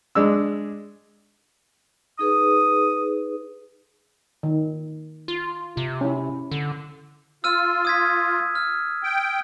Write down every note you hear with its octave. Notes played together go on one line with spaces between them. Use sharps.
G#3 D4 E6
D#4 G#4 B4 D#6
D#3
F4
C3
C#4 E4
D3
F4 E6 F6 D#7
D#6 G#6 B6
F6
G5